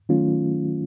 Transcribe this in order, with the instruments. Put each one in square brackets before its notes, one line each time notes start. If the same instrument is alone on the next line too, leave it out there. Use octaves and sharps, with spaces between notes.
[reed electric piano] D#3 F#3 A3 C#4 F4